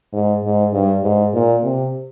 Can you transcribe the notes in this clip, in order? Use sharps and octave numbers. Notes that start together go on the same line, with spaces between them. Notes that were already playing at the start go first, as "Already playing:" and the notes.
G#2
G#2
G2
G#2
A#2
C3